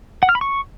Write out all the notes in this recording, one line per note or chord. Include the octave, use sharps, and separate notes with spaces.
F#5
F6
B5
C#6